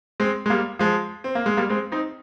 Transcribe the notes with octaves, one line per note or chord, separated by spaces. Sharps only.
G#3 C4
G#3
G3 A#3
F3 G#3
C4
A#3
G#3
G3 A#3
G#3 C4
C4 D#4